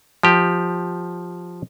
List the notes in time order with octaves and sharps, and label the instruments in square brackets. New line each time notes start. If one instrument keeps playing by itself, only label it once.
[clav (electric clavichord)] F3 G4